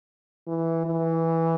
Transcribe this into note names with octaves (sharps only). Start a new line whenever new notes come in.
E3
E3